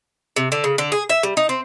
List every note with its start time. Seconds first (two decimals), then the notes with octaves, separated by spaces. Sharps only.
0.36 C3
0.52 D3
0.64 C#3
0.78 D3
0.92 G#4
1.09 E5
1.23 G3
1.37 D#4
1.49 C4